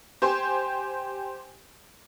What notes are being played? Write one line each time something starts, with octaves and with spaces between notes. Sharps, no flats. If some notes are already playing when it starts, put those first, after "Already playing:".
G4 C5 G#5 C6